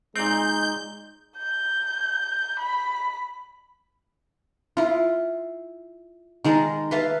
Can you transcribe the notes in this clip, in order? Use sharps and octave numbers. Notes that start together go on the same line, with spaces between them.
A#2 G#3 C4 D#4 G6
G6
B5
E4 F4
D#3 G#3 A#4 A5
B4 E5 F5 A5